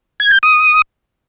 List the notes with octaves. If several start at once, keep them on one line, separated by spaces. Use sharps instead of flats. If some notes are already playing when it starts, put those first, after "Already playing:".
G#6
G6
D#6